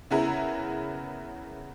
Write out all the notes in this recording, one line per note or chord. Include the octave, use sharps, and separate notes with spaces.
C#3 B3 E4 G#4 A#4